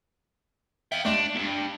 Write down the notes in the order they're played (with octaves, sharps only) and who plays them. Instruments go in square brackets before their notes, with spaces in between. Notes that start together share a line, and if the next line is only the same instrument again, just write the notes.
[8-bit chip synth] E5 [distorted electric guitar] F5 G5
[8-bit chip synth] D#2 G#3 A3 [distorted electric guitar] D4
[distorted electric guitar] E2 G2